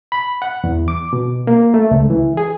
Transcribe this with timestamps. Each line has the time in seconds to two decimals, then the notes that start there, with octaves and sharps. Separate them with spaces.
0.12 B5
0.42 F#5
0.64 E2
0.88 D6
1.13 B2
1.47 A#3
1.74 A3
1.91 C#2
2.10 E3
2.37 G#4